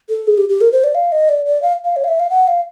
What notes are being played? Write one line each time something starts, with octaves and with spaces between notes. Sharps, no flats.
A4
G#4
G4
G4
A#4
C5
D5
F5
D#5
D5
D5
F5
F5
C#5
F5
E5
F5
F#5
F5